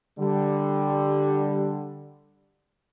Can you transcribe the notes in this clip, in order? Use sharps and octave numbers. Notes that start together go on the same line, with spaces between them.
D3 G3